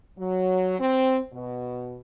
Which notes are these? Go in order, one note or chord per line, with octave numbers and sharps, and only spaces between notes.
F#3
C4
B2